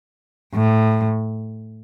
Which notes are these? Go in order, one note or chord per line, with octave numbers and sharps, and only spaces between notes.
A2